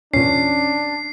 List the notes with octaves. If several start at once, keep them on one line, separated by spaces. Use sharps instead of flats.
E2 A#2 C#4 D4 C7